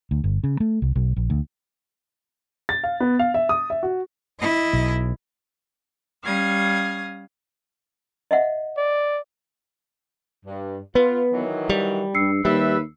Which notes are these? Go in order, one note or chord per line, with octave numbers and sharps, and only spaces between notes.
D2
G1
C#3
A3
C2
B1
A#1
D2
A6
F5
B3
F5
E5
D#6
E5
F#4
E4 D#5
B1
G3 C#4 F5 D#6 G#6
D#5 E5 F#5
D5
G2
B3 F4 B4
D#3 E3 F#3
G3 F7
G2 E6 C7 C#7
D#2 G3 B4 E5